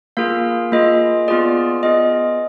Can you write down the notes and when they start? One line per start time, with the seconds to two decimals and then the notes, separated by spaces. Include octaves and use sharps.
0.17 A#3 F4 G#4 F5
0.72 A#3 F4 G#4 D#5
1.28 B3 F4 G#4 D5
1.83 B3 F4 G#4 D#5